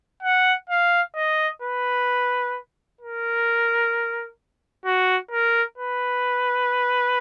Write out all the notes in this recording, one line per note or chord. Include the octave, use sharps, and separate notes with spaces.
F#5
F5
D#5
B4
A#4
F#4
A#4
B4